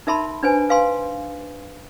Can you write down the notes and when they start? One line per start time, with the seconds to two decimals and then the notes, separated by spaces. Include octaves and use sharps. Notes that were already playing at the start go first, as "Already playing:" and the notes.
0.07 D#4 A#4 E5 A5 B5 C6
0.43 D4 B4 C5 G#5
0.70 B4 F5 G#5 C6